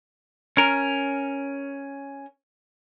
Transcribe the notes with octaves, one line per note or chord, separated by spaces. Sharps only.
C#4 A#4